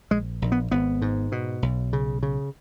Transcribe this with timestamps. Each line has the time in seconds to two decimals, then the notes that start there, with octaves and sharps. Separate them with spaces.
0.11 A#1 G#3
0.42 A#1
0.52 B3
0.71 G#1 B3
1.02 G#2
1.32 B2
1.62 B1
1.93 C#3
2.23 C#3